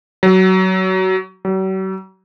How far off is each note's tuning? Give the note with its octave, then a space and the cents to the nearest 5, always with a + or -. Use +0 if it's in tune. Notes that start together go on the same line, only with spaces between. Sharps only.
F#3 +20
F#3 +45